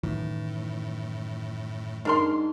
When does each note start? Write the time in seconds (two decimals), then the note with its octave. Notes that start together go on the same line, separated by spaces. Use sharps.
0.03 F#2 A2 D#3 E3
2.05 G#2 D4 A#4 C6